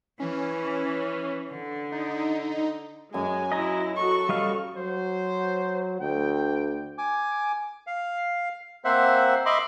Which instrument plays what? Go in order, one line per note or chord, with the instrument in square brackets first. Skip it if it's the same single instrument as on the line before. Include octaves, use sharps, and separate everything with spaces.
[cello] E3 [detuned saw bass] C#4
[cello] D3
[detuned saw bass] D#4
[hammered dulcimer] F#2 [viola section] G#3 [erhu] G#5
[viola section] F#3 E4 [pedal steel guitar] D#5 A#5
[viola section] F#4 A4 [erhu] C#6
[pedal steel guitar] G3 D#5 F5
[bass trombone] F#3 [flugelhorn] C5
[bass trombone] D2 [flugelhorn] G5
[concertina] G#5 D6
F5
A#3 C4 C5 E5 F#5
D#5 E5 B5 C6 D6